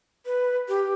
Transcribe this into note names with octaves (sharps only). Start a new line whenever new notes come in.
B4
G4